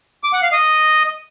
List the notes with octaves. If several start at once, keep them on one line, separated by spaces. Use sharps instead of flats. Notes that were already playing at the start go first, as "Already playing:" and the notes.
D6
F#5
F5
D#5